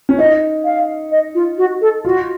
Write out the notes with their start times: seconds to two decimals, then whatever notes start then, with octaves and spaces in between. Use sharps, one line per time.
0.09 C#4
0.18 D#4 D#5
0.65 F5
1.12 D#5
1.35 F4
1.58 F#4
1.81 A4
2.05 F4 F#4